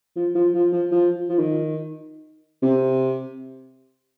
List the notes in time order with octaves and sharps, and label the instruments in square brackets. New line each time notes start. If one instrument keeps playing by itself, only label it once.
[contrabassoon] F3
F3
F3
F3
F3
F3
D#3
C3